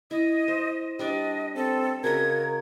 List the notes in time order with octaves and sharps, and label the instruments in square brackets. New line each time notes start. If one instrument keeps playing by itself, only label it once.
[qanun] E4 [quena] D#5
[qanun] C5
[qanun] G3 D4 D5 [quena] D#5
[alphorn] C4 [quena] A4
[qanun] C#3 F#4 D#5 [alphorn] A#4 [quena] G#6